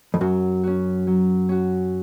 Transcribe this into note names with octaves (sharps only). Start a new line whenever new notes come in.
F2
F#2 F#3
C#4 F#4
F#3
C#4 F#4